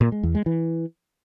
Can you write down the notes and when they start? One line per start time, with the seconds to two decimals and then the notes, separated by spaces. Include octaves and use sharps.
0.01 A#2
0.12 G#3
0.23 E2
0.35 G#3
0.46 E3